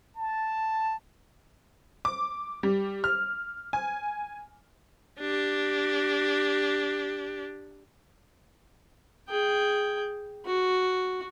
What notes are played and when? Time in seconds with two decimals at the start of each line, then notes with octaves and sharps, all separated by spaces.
0.17 A5
2.05 D6
2.63 G3
3.04 F6
3.73 G#5
5.20 D4 G4
9.29 G#4 G5
10.46 F#4